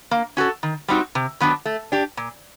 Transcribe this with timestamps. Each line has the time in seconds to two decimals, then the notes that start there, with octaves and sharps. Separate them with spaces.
0.11 A#3
0.37 C#4 F#4 A4
0.63 D#3
0.88 G3 C4 D#4 F#4
1.15 C3
1.40 D#3 F#3 B3 D4
1.65 A3
1.92 D4 G4
2.17 A#2